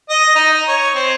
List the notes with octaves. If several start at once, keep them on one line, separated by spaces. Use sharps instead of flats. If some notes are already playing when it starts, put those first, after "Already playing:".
D#5
D#4
C#5
C4